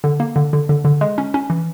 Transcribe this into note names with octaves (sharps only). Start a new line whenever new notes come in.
D3
A#3
D3
D3
D3
D3
G#3
C#4
C#4
E3